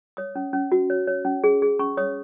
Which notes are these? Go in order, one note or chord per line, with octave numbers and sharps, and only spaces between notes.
C#5 D#6
C#4
C#4
F#4
C#5
C#5
C#4
G#4
G#4
C#4 C#6
C#5 D#6